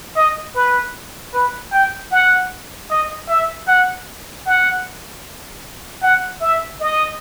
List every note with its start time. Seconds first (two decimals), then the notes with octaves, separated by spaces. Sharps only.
0.16 D#5
0.55 B4
1.34 B4
1.72 G5
2.12 F#5
2.90 D#5
3.28 E5
3.68 F#5
4.46 F#5
6.03 F#5
6.41 E5
6.80 D#5